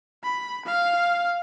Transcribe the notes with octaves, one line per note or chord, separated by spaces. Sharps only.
B5
F5